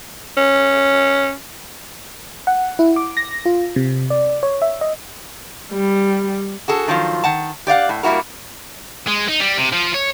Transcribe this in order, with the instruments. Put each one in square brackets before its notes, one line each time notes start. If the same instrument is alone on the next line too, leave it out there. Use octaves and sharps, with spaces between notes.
[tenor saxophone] C#4
[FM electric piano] F#5
E4
D6
A#6
F4
C3
D5
C#5
E5
D#5
[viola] G3
[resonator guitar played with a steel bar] F#4 G#4 A4
D#3 F3 F#3 F4
D#3 F#5 A5
G4 D5 F5 F#5
A2
G3 A#3 E4 F#4 A#4
[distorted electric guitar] G#3
D#4
G3
C3
F3
C#5